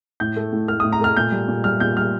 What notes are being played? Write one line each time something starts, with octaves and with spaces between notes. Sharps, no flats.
A2 G6
A3
A2
A3 F6
D#6
A2
A#5
A3 F6
A#2 G6
G3
A#2
G3 F6
A#2 G6
G3 F6